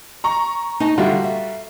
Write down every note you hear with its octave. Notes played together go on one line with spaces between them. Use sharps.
A#5 C#6
D#4 D#5 A5
D3 G3 F4 F#4 E5
E5